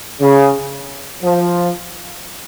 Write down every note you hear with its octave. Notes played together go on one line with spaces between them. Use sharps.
C#3
F3